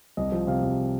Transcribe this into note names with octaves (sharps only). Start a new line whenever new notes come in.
C2 D#5
F3
C3 F5
C2